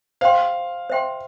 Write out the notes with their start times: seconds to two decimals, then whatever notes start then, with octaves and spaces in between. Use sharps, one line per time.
0.21 C5 F5 G5 C6
0.90 C5 E5 G5 C6